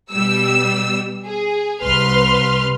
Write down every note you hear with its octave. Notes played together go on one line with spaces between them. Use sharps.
B2 G3 E6
G#4
C2 B4 C6 F6